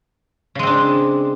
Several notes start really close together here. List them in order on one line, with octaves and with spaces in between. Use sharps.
C#3 G#3 C4 D4